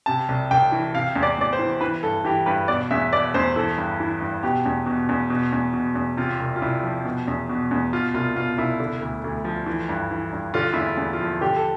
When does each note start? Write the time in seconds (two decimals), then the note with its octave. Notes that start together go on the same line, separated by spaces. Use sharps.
0.06 C3 A5
0.28 C2
0.51 C2 G5
0.72 E3
0.94 C3 F5
1.16 E2
1.23 D5
1.38 E2 D5
1.53 C5
1.59 E3
1.81 E3 B4
2.03 G2 A4
2.25 E3 G4
2.46 G2 B4
2.68 B2 D5
2.91 E2 E5
3.12 B2 D5
3.34 E2 C5
3.56 E3 A4
3.77 G2
4.00 E3
4.21 G2
4.43 B2 G4
4.66 E2
4.86 B2
5.09 E2
5.30 B2
5.52 E2
5.74 B2
5.95 E2
6.17 C3 F4
6.40 C2
6.56 F4
6.62 C2 E4
6.83 F3
7.05 B2
7.28 E2
7.49 B2
7.71 E2
7.93 B2 F4
8.14 C2 F4
8.36 B2 F4
8.58 C2 E4
8.80 D3
9.01 D2
9.24 D2
9.45 F3
9.66 E3
9.89 G2
10.11 E3
10.32 G2
10.54 D3 F4
10.73 E2 E4
10.83 F4
10.97 E2
11.13 F4
11.20 F3
11.41 D3 G4
11.56 A4